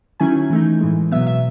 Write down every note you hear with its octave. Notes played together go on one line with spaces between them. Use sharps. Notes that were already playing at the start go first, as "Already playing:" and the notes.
D#3 F#3 C#4 E4 G#5
E3 A3 D#4
A2 E3 G#3
B2 F#3 B3 E5
E5